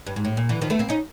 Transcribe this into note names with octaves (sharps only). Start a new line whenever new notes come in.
G2
G#2
A2
A#2
D3 E3
D#3 F3
A3 B3
A#3 C4
C#4 D#4